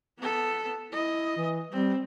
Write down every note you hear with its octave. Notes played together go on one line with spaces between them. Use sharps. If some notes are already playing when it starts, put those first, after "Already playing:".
B3 A4
E4 D#5
E3
G3 C4